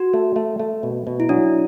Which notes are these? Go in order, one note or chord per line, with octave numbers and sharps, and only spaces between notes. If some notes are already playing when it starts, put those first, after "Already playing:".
Already playing: F#4
A3
A3
A3
B2
B2
E4
F#3 D4